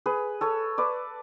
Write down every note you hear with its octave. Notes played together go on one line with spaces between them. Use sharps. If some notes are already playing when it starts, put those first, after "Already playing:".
G#4 B4
A4 C#5
B4 D5